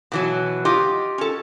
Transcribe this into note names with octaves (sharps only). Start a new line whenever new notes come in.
B2 E3 F#3
F4 G4 D#5
C#4 A4